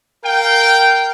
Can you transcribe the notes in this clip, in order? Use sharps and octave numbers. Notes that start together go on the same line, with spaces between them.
A#4 F5 G5